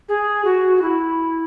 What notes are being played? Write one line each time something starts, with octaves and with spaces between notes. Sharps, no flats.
G#4
F#4
F#4
E4